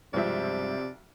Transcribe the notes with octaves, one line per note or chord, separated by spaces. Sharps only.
B1 G2 C3 F3 G#3 C4 D5 E5